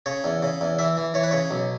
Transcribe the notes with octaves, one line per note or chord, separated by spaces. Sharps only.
C#3 C#5
E2
C#3
E2
E3 E5
E3
E3 C#5
B4
C#3 C#5
B1